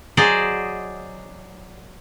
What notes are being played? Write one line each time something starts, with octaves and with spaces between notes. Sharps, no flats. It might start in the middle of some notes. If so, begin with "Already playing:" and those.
F#3 G#4 C5 D5 D#5